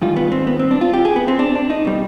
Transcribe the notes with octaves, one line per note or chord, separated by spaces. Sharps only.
G#2 D#3 G3 F4
B3
C4
B3
C4
D4
F4
G4
G#4
B3
C4
D4
D4
D#4
B2 G3